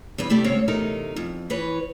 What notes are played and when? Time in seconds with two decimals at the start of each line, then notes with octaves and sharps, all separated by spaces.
0.18 E2 G2 B4
0.30 C3 A3 G4 D5
0.44 G#2 C#3 C4 C#5 F5
0.68 E2 C3 A3 D#4 A#4
1.16 F2
1.50 E3 B4 C#5